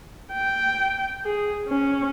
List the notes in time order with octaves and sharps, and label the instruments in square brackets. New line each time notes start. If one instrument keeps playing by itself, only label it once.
[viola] G5
G#4
C#4